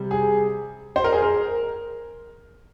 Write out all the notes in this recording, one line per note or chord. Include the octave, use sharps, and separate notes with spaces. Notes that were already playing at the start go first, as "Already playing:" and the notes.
Already playing: C3 G3
G#4
C5
A#4
G#4
A#4